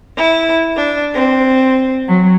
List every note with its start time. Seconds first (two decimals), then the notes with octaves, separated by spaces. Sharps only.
0.17 E4
0.76 D4
1.14 C4
2.07 F#3